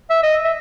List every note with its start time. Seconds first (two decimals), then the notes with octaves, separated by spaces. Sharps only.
0.10 E5
0.23 D#5
0.44 E5